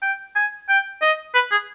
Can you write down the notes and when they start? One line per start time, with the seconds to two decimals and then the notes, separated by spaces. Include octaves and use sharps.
0.02 G5
0.36 G#5
0.68 G5
1.01 D#5
1.34 B4
1.51 G#4